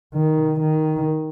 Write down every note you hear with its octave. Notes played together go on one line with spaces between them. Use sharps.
D#3
D#3